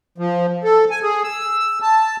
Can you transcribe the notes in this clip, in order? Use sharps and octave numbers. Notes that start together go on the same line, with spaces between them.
F3
A4
G#5
G#4
E6
A5